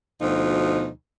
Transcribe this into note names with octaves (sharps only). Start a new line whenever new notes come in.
D2 B2 F3 D#4